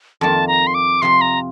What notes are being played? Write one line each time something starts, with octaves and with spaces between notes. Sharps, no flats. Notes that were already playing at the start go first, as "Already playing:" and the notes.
F2 D#3 A#3 A5
A#5
C6
D6
C3 F3 C4 C6
A#5